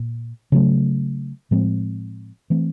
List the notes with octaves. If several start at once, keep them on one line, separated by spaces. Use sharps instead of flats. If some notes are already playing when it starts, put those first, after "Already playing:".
Already playing: A#2
C#3 F#3 A3
A2 F3 G#3 C4
E3 A3 C4